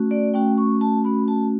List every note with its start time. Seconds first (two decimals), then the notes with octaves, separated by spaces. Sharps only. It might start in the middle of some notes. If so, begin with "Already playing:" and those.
Already playing: A3 C#4 F#4
0.11 D5
0.34 A3 C#4 F#4 G5
0.58 C#6
0.81 A5
1.04 A3 C#4 F#4 B5
1.28 A5